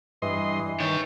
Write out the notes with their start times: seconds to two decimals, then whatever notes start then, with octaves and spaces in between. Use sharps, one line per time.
0.22 G2 E3 D#5 C6
0.80 D#3 C#5 G5